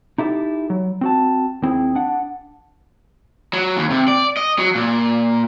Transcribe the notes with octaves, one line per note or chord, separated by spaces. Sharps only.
D#4 E4 G4 A4
F#3
C4 F#4 A5
D#2 C4 E4 G#4
D4 F#5
F#3
D#2
C3
D5
D#5
F#3
A#2